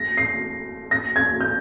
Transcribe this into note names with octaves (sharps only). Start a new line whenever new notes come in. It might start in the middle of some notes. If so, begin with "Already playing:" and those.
Already playing: A#6
C7
A#6
G#6
G6